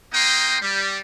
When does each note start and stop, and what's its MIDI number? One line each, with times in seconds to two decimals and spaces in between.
0.13 0.57 58
0.13 0.57 63
0.13 0.57 79
0.13 0.57 84
0.13 0.57 87
0.61 1.00 55